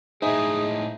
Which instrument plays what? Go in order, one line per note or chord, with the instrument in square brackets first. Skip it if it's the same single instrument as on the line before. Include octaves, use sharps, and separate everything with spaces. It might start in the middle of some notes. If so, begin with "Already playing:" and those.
[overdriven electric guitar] A2 G#3 [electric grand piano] D#4 [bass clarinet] G#4 [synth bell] C5 E5